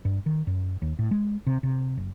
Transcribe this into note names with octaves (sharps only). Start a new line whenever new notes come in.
G2
D#3
F#2
D#2
A2
G#3
C3
C3
F#1